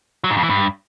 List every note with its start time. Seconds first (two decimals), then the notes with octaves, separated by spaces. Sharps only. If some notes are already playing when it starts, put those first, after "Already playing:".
0.24 F#3
0.30 G#2
0.37 F2
0.43 E3
0.50 G2